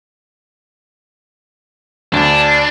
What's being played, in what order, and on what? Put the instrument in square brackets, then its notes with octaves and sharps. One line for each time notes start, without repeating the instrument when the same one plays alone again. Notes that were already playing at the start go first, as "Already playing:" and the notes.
[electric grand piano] D2 [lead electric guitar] D4